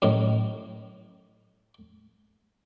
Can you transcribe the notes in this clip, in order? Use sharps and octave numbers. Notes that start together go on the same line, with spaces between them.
F#2 A2 D#3